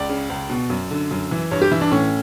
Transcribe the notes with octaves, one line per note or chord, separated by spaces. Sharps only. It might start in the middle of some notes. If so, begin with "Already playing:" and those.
Already playing: C#2 D5
C#3
C#2
B2
F#2
D3
F#2
E3
G2 C#5
G4
E3 E4
D4
A2 C#4